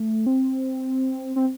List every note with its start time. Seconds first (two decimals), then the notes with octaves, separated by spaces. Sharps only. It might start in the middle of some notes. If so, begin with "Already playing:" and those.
Already playing: A3
0.26 C4
1.36 C4